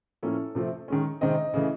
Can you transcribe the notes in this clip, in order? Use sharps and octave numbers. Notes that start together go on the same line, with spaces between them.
A2 F3 A#3 C#4 A4
C3 F3 A3 C4
D#3 G#3 C#4
C3 D#3 G#3 C4 D#5
C#3 E3 A3